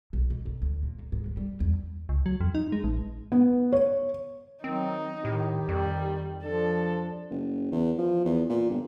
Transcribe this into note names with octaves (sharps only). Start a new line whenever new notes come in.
B1
B2
G1
D2
A#2
G1
G#2
F#3
G3
E2
C#2
F#3
F2
D#4
G#3
A1
B3
C#5
D#3 F#3 C4 D#4
A2 D#3 G4
F2 D#3 G3
F3 D4 A4
F#1
E2
F3
E2
A#2
G1